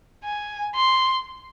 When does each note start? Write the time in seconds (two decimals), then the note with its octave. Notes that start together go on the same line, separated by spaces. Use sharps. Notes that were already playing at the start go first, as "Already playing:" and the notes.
0.24 G#5
0.75 C6